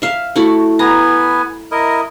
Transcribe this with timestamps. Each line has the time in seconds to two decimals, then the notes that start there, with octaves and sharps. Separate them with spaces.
0.02 E5 F5
0.36 A3 E4 F#4
0.79 B3 B4 G#5 A#5
1.71 E4 A#4 D#5